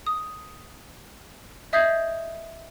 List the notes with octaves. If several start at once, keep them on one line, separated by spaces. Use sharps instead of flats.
D#6
D#5 E5 D#6 G6 G#6 C7